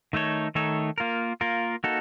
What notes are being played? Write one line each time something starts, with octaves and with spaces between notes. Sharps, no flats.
D#3 A3 D#4 A4 C#5
D#3 A3 D#4 A4 C#5
A#3 F4 A#4
A#3 F4 A#4
A#3 D#4 F#4 A4